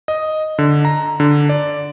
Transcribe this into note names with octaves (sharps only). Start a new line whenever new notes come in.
D#5
D3
A#5
D3
D5